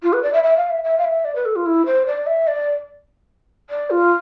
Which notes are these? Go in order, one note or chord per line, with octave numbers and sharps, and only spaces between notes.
F4
B4
D5
E5
E5
F5
E5
E5
F5
E5
D5
B4
A4
F4
E4
C5
D5
E5
D5
D5
F4